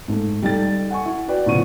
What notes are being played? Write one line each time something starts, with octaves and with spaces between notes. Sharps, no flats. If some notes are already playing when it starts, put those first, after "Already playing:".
G#2 A3
G3 D#4 A4 G5 A6
F#5 G#5 C#6
E4
F#4 B4 D5 G5
A2 C#3 F3 B3 C#6 D#7